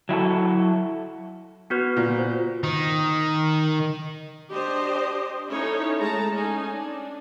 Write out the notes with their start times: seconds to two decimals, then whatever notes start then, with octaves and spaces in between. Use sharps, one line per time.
0.09 F#3 E4 F#4 A4
1.70 B3 F#4 B4 F6 G6 B6
1.96 A#2
2.17 F4 C5
2.64 D#3 D#4
4.51 D4 G4 C5 D#5
5.49 C#4 D#4 E4 A4 C#5
5.99 G#3 A3 A5 A#5
6.34 C#4 D#4 G#5
6.70 D4